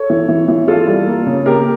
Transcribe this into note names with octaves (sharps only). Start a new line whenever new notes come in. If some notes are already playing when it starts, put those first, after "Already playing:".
Already playing: A4 C#5
E3
E3
E3
E3 F4 A4
G3
A#3
C#3
A#3 G4 A#4